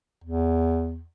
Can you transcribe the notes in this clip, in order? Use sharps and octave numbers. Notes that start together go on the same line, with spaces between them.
E2